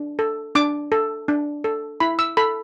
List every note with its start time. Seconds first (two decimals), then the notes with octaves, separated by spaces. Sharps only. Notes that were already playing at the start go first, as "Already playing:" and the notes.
Already playing: D4
0.19 A4
0.55 D4 D6
0.92 A4
1.28 D4
1.64 A4
2.00 E4 B5
2.19 E6
2.37 A4 B5